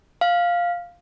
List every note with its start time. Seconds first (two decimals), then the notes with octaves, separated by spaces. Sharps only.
0.21 F5